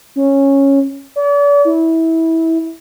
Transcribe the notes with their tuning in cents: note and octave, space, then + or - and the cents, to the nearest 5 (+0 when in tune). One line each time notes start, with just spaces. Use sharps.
C#4 -10
D5 -40
E4 -20